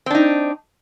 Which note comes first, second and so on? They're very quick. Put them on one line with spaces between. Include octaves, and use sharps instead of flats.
C4 D4 D#4